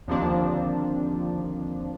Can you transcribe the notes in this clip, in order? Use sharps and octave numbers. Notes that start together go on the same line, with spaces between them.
D#2 D3 F3 A#3 C4 D4